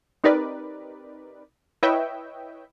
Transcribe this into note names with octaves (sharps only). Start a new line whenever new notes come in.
C4 D#4 G4 A#4 B4 D5
E4 B4 C#5 D#5 E5 G5